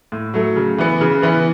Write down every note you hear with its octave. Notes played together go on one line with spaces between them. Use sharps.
A2
F#3 A3
C#3
E3 B3
C#3
E3 B3